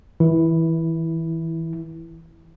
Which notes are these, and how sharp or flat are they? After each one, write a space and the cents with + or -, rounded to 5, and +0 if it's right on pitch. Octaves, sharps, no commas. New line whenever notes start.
E3 -25 E4 +0